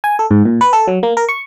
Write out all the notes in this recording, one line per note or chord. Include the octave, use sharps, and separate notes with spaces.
G#5
A4
G#2
A#2
B4
A4
F#3
A#3
A#4
C#6